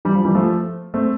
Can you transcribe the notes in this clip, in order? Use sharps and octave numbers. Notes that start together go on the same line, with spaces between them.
E3 G3
F3
E3 G3
F3 A3
A3 C4